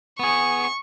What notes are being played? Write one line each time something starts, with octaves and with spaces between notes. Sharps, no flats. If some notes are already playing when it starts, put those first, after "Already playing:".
B3 G#4 C#6